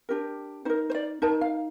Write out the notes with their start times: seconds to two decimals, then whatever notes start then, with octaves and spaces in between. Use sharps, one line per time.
0.09 D4 G4 A#4
0.65 D#4 A#4 C5
0.90 C5
0.95 D5
1.22 D#4 A#4 A5
1.41 F5